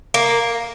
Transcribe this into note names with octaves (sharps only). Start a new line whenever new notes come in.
A#3